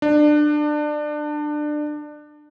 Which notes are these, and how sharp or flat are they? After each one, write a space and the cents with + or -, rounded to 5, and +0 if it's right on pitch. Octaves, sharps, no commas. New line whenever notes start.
D4 +25